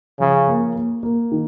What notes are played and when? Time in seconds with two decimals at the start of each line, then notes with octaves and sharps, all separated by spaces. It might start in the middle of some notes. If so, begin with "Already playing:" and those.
0.20 C#3 F3
0.48 A#3
0.75 A#3
1.03 A#3
1.32 D#3